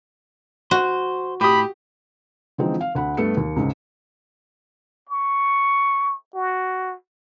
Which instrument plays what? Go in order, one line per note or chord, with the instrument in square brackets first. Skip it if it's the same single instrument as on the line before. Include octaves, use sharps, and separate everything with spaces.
[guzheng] F#4 [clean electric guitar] C5
[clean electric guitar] A2 [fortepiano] G4 D#6 [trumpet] B5
[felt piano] D3 E3 F3 G#3 C4 D#4
F5
D2 F#5 B5
G2 A3 B3 A4 C#7
D#2
C#2 G#2 C#3
[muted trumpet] C#6
F#4